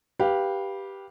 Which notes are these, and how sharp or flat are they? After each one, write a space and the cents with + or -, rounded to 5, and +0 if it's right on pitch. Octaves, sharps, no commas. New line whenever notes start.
G4 +0 B4 -15 F5 +0